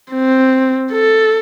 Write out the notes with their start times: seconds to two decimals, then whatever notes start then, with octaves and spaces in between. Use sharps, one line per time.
0.11 C4
0.92 A4